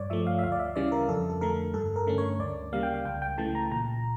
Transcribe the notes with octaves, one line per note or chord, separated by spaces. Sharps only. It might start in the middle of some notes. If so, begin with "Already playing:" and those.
Already playing: G2 C#5 D5
F3 A3 E5
F5
E5
D2 F5
D5
E5
C#3 E3 G3 C#4 D5
A#4
F2 A4
A4
D3 A3 A#4
G2 A4
A#4
D3 A3 C#4
C#5
D2 D5
C#3 G3 A#3 F5
G5
F5
C#2 G5
G5
C#3 E3 A3 A5
A#5
A#2 A#5